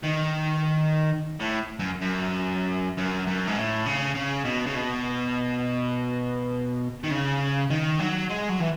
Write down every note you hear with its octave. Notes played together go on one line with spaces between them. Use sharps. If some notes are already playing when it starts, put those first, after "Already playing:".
D#3
A2
F#2
F#2
F#2
F#2
G#2
A2
C#3
C#3
B2
C#3
B2
D#3
C#3
D#3
F#3
G#3
F#3
E3